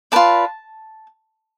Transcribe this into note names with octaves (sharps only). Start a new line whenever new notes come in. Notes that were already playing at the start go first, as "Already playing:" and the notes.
F4 B4 D5 A5